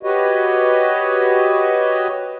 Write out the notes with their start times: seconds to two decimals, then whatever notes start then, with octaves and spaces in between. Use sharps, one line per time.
0.03 F#4 G4 B4 C#5 D#5